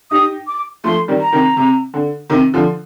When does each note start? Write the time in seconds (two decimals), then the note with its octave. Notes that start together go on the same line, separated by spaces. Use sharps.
0.11 D#4 G4 D#6
0.47 D6
0.84 F3 A3 C6
1.08 D#3 G3
1.20 A#5
1.32 C3 D#3
1.57 C3
1.94 D3
2.30 C3 D#3
2.54 D3 F3